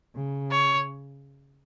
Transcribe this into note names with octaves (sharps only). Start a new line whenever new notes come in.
C#3
C#5